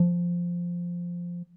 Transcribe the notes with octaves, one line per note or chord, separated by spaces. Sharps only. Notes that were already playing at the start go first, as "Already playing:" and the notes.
Already playing: F3